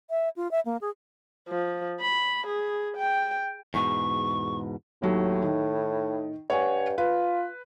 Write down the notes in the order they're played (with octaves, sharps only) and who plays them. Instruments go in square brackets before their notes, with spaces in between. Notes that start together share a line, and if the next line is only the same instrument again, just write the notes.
[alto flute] E5
F4
E5
A#3
G#4
[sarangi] F3
B5
G#4
G5
[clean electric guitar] E2 G#2 B2 [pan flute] C#6
[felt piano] D#2 F#3 [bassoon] A2
[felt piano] D#3
[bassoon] G2 [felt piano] C#5 F#5 G#5
[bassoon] F4 [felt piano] B4